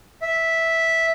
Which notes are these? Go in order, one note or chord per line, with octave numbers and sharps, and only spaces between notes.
E5